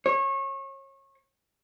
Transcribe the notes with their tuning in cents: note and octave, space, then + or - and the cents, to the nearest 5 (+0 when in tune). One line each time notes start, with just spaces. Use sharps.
C#5 -30